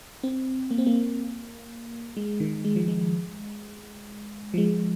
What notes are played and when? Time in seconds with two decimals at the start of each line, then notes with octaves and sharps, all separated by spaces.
0.23 C4
0.71 A#3
0.78 C4
0.87 A#3
2.17 G#3
2.40 D#3
2.65 G#3
2.76 F3
2.88 G#3
4.54 F3
4.58 G#3